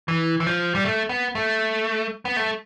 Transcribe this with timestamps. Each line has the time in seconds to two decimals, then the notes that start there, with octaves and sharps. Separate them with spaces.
0.08 E3
0.40 E3
0.46 F3
0.75 G3
0.84 A3
1.09 B3
1.35 A3
2.25 B3
2.36 A3